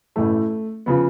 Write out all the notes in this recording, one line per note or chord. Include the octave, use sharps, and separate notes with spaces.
A1 A2 E3 A3
C#3 F3 B3